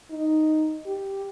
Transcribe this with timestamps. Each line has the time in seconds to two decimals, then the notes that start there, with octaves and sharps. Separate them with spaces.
0.11 D#4
0.86 G4